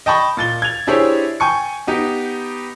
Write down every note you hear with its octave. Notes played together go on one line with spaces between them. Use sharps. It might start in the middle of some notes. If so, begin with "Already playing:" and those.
D#5 G5 A5 B5 C#6
A#2 A6 G7
G#6 F7
D4 E4 G4 G#4 C5 C#5
G5 G#5 C#6 C#7
B3 D#4 G4